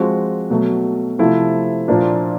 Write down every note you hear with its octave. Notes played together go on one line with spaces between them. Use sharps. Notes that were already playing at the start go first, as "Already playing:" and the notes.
Already playing: F3 G#3 C4 F#4
B2 F#3 A3
C3 F3 A3 E4
A#2 F3 A#3 D4